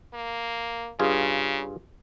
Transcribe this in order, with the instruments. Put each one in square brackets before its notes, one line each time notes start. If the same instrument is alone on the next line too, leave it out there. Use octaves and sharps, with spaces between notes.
[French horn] A#3
[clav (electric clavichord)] G2 F4 G#4 [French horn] C#3